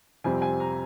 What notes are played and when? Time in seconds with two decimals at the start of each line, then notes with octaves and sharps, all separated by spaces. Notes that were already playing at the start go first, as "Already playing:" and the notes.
0.24 F2 C3 G3 C4 G#5
0.42 G#5
0.60 A#5